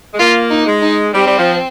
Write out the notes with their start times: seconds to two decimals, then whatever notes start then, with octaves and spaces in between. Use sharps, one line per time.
0.14 G#3
0.19 A#3 F4
0.50 D#4
0.66 G#3
0.82 D#4
1.13 G3 C4
1.26 G3
1.38 F3